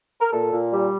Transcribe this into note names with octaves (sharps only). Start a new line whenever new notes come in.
A#4
A#2 A4
A#2
G3